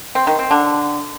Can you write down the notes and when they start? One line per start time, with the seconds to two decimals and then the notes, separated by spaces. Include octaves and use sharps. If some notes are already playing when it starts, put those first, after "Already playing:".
0.15 C4
0.27 D#3
0.39 C4
0.51 D3